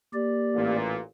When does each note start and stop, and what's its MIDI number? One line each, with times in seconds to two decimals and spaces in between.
0.14 0.79 58
0.14 0.76 67
0.14 0.76 74
0.54 0.99 33
0.54 0.99 46